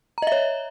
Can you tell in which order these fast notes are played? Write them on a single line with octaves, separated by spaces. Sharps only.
A#5 D#5 E5 C#5